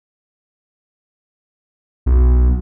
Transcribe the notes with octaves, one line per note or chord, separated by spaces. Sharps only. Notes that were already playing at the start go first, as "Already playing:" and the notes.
B1